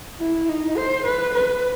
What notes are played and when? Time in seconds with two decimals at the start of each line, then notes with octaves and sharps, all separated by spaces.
0.20 E4
0.49 D#4
0.78 C5
1.06 B4
1.34 B4